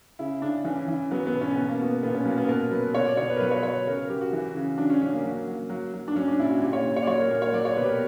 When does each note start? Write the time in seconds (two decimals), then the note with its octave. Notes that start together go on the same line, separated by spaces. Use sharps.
0.19 C#3 E4
0.42 C#3 D4
0.64 E3 C#4
0.88 E3
1.11 F#3 B3
1.27 B3
1.33 B2
1.41 C#4
1.55 B2 B3
1.69 A#3
1.80 B2 B3
2.03 A#2 B3
2.14 C#4
2.25 F#3 A#3
2.38 B3
2.49 B2 A#4
2.71 F#3 B4
2.94 B2 C#5
3.06 D5
3.17 B2 C#5
3.30 B4
3.36 A#4
3.40 F#3 B4
3.51 C#5
3.63 F#3 C#5
3.86 C#3 A#4
3.97 A#4
4.09 F#3 G4
4.21 F#4
4.33 E3
4.56 C#3
4.78 F#3 D4
4.90 C#4
5.01 F#3 C#4
5.13 A#3
5.24 F#3
5.48 F#3
5.70 F#3
5.94 F#3
6.08 D4
6.16 F#3 C#4
6.28 D4
6.39 A#2 E4
6.50 F#4
6.62 A#2 G4
6.73 C#5
6.85 A#2
6.96 C#5
7.03 D5
7.07 F#3 C#5
7.19 A#4
7.30 A#2 A#4
7.42 C#5
7.53 F#3 D5
7.65 C#5
7.77 B2 B4
7.84 G4
7.88 A#4